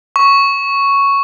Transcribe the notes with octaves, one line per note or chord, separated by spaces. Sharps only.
C#6